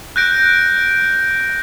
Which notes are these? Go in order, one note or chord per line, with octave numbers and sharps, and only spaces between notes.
F#6 G6 A#6 D7